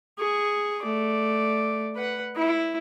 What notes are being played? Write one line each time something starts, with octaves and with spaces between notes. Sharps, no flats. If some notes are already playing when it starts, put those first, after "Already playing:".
G#4 C#6
A3 D5
B4 F#5
E4